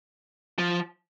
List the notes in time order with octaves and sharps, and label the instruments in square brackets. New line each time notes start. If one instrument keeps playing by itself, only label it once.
[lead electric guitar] F3